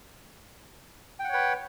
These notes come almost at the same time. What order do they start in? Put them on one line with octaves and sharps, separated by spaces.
G5 F#5 C#5 B4